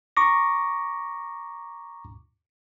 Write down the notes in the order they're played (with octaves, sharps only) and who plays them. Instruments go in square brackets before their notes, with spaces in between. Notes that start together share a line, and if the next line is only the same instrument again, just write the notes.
[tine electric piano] A#5 C#6 D6 A#6